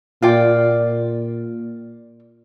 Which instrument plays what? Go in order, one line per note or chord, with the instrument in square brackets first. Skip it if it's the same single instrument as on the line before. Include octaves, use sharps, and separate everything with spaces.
[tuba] A#2 [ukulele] F4 D5 G5